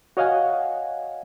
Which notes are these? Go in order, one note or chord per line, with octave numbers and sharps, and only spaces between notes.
F#4 C#5 D#5 F5 F#5 G#5